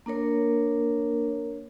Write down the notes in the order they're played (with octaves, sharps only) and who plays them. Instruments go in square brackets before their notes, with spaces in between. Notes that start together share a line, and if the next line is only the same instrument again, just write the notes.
[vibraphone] A#3 D4 A#4 C#5